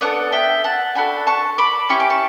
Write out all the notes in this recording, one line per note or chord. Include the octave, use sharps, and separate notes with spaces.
B3 D4 A4 D5 F#5
E5 G5
F#5 A5
D4 F#4 A4 G5 B5
A5 C#6
B5 D6
C#4 E4 G4 C#6
D6
A5 C#6